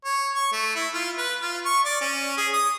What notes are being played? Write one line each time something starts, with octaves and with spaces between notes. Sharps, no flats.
C#5
C#6
A3
E4
F4
B4
F4
C#6
D5
C#4
G#4
D#6